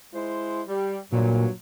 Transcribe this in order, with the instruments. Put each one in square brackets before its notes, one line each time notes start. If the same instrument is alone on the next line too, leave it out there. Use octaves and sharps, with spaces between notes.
[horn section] G#3 E4 C5
G3
[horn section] G2 F#3 [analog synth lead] A#2